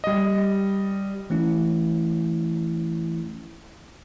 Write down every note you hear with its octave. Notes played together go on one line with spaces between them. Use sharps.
G3 D#5
E3 A3 C#4 E4